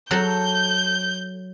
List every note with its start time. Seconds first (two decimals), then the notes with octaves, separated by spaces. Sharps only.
0.11 F#3 A4 G6